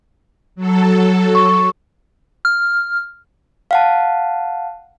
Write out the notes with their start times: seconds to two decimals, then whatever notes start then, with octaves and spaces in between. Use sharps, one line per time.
0.55 F#3 A4
1.35 C#6
2.45 F6
3.71 F5 F#5 A5